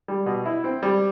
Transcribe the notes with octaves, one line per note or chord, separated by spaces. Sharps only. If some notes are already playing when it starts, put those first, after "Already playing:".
G3
B2
E4
C4
G3